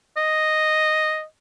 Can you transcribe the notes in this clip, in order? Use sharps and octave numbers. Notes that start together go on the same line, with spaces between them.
D#5